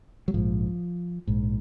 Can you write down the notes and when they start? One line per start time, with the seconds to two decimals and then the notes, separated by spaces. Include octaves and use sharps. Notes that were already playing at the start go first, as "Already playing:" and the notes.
0.28 F#3
0.34 A#1 G#2 F3
1.27 A#1 G#2